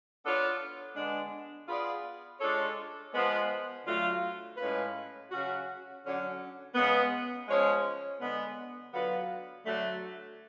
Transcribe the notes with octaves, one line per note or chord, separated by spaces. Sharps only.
B3 D4 F4 A4 C#5
D3 G#3 B3 D4
B3 F4 G#4 B4 D5
G#3 D4 F4 A4 C#5
F3 G#3 B3
D3 F#3 A3 F4
A2 G#3 C#4 F4 B4
C#3 F#3 C#4 F#4
D3 F#3 C#4
C#3 G#3 B3
F3 G#3 C#4 G#4 C#5
D3 G#3 B3
D3 F#3 B3 F4 B4
D3 F#3 A3